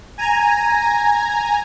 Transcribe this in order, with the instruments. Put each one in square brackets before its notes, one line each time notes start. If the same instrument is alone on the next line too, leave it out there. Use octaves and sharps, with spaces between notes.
[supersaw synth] G#5 A#5